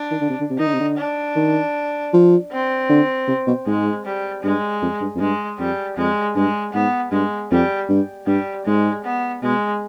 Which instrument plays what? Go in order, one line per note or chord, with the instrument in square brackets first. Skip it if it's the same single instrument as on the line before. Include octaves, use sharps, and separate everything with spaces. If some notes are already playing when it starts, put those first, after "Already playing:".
Already playing: [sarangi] D4
[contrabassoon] D#3
D3
C3
D3
C3
[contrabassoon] D#3 [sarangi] D#4
[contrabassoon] D3
C3
D3
[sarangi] D4
[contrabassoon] D#3
F3
[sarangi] C4
[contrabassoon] D3
C3
B2
[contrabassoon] G#2 [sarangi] G#3
[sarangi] G3
[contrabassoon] G2 [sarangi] G#3
[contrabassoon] F2
G2
F2
[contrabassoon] G2 [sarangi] G#3
[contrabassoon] F2 [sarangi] G3
[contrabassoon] F2 [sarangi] G#3
[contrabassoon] G2 [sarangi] G#3
[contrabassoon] G#2 [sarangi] B3
[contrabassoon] G2 [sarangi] G#3
[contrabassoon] F2 [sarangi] G3
[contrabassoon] G2
[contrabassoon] G2 [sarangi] G3
[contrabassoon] G#2 [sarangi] G#3
[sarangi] B3
[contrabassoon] B2 [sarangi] G#3